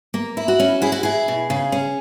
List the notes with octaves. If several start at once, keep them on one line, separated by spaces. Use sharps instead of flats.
A#3
E4
F#4
C#4
E4 G#4
F#4
E4 G#4
B2
C#3
C#4